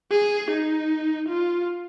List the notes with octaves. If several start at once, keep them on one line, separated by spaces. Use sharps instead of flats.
G#4
D#4
F4